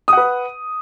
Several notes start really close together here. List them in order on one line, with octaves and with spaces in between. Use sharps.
D#6 F#5 B4